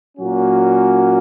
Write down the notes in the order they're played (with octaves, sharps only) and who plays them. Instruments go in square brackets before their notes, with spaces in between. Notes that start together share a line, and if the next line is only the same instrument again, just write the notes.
[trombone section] A#2 F#3 A#3 C#4 F#4